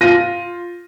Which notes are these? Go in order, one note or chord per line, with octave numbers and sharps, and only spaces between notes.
F4 A#6 D#7